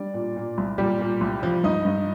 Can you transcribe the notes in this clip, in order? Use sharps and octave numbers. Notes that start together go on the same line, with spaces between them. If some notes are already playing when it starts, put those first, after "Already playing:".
Already playing: G3 D4 D5
A#2
A#2
C2
A#2 G3 G4
A#2
C2
F3
G2 D#4 D#5
G2